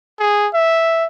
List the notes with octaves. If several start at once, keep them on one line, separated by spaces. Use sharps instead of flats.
G#4
E5